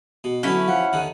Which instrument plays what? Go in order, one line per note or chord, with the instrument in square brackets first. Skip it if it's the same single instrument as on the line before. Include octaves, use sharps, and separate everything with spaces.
[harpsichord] B2
[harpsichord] D3 F#3 B3 [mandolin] C#4 E4
[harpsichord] F3 [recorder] F#5
[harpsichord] D#2 D3 D#3